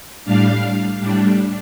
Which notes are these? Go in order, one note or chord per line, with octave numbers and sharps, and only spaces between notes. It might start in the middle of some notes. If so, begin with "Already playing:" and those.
A2 G3 D4 F5
A2 G3 D4